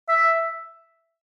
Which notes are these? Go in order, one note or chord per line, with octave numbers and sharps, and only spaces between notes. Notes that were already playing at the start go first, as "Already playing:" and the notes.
E5